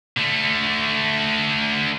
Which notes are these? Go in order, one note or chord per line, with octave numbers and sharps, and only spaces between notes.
D3 A3